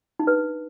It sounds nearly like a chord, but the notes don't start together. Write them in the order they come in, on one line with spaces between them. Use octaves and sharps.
D#4 D4 B4